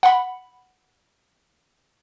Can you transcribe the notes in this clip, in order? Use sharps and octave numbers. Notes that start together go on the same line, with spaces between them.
F#5 B5